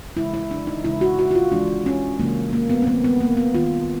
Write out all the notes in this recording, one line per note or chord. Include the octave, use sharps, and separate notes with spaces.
C#3 E3 G#3 E4
E4
D4
D#4
C#3 E3 G#3 E4
F#4
F#4
F#4
F4
C#3 E3 G#3 D4
C#4
C#3 E3 G#3 A#3
A#3
B3
C4
D#3 G3 A#3 B3
B3
A#3
B3
D#3 G3 A#3 F4